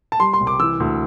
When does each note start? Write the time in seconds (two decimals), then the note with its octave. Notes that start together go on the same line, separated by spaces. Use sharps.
0.12 A5
0.20 G3 C6
0.33 C6
0.41 C2
0.47 D6
0.59 E3 E6
0.80 D2